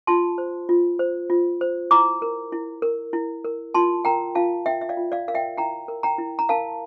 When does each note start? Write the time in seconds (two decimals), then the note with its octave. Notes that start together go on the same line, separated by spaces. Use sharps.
0.07 F4 A5 C6
0.38 C5
0.69 F4
0.99 C5
1.30 F4
1.61 C5
1.91 E4 A#5 D6
2.22 A#4
2.52 E4
2.82 A#4
3.13 E4
3.44 A#4
3.74 F4 A5 C6
4.05 A#4 G5 A#5
4.35 F4 F5 A5
4.66 A#4 E5 G5
4.81 E5
4.89 D5 F5
4.97 F4
5.12 D5 F5
5.28 A#4 F5
5.34 E5 G5
5.58 E4 G5 A#5
5.88 A#4
6.03 G5 A#5
6.18 E4
6.39 A#5
6.49 A#4 F5 A5